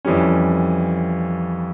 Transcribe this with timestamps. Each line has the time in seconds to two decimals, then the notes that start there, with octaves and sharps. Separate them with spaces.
0.05 F2 E3 G3 C#4